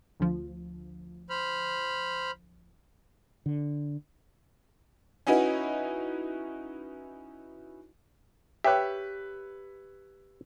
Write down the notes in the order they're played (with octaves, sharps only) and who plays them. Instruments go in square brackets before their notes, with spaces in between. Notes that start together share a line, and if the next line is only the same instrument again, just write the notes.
[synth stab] D2 F3
[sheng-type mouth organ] C5 B5 F6
[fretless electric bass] D3
[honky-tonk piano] C#4 D#4 E4 F#4 B4
[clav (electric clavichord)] G4 [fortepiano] B4 C#5 E5